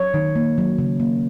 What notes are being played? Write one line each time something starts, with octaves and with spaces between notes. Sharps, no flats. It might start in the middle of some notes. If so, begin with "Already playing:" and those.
Already playing: F#3 C#5
D#3
A#3
F#3
C#3
A#3